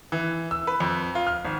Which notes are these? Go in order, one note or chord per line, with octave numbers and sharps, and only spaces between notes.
E3
E6
B4
F2
F4
F6
G#1